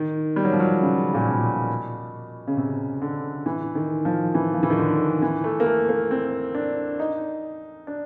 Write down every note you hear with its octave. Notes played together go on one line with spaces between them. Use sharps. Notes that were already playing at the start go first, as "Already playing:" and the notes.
Already playing: D#3
G3
F#3
F3
F#3
C#3
A#2
B2
C#3
C3
D3
E3
D#3
F3
E3
F3
E3
D#3
D3
E3
A3
A#3
A3
A#3
C4
D4
D#4
D4